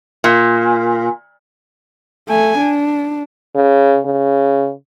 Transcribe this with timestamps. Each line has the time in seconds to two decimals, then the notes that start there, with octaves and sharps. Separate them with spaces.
0.24 A#2
2.29 A3 G#5
2.58 D4
3.55 C#3
4.05 C#3